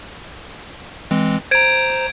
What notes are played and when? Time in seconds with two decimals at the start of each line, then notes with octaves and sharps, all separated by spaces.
1.11 E3 G#3 C4
1.51 C5 A#5 G#6 D7